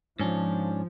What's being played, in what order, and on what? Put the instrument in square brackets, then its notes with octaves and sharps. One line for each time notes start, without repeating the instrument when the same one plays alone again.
[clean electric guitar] G#2 C#4 D4 [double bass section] F3